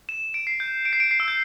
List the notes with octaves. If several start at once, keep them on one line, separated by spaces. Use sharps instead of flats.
E7
D7
C7
G6
D7
C7
D7
C7
E6
G6